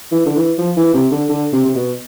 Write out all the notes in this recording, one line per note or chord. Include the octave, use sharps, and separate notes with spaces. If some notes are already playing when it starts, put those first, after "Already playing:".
E3
D3
E3
F3
E3
C3
D3
D3
C3
C3
B2